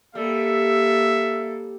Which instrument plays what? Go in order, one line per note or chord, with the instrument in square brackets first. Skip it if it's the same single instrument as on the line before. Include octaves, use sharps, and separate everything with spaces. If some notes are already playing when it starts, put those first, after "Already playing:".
[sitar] G3 [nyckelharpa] A#3 A4 [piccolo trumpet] E5